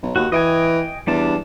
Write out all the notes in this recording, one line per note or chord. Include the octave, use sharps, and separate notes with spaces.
B1
D#2 F#4
E3 D#5 G5 G#5
E2 G3 D4 A5